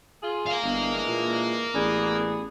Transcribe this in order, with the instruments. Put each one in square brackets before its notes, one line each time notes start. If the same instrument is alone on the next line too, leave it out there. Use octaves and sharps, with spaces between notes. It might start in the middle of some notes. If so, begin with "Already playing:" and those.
[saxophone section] F4 G#4
[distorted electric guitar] A#4 F5
[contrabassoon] G1 [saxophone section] D3 E3 G#3
[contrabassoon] A#2
[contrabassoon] A1 [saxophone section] B3 D4 G#4